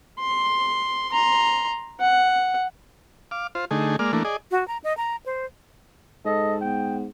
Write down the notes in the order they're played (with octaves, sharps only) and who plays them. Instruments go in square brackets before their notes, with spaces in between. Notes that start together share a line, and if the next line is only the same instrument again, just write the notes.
[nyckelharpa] C6
A#5 C6
F#5
[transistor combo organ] F5 D6
F4 C5
D3 A3 D#4 G#4
G#3 A#3 D5 F6
E3 A3 A#3 D4
G#4 D5 D#5
[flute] F#4
A#5
D#5
A#5
C5
[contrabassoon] G#2 [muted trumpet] A4 [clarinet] D#5
[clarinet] B3 [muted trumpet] G5